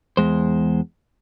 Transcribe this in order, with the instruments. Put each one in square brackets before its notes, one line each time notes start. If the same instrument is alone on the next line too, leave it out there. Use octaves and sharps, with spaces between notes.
[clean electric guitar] E2 G#3 C5